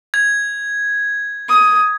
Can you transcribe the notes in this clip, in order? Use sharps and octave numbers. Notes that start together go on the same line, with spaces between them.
G#6
D#6